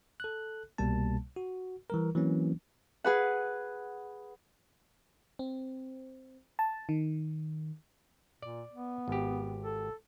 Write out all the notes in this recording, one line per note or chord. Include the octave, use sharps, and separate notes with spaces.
A4 F#6
C2 B2 G3 A#3 A5
F#4
E3 G3 A#4
E3 F#3 A#3 C4 C#4
G#4 B4 F#5
C4
A5
D#3
A#2 D5
B3
G#1 G4
A4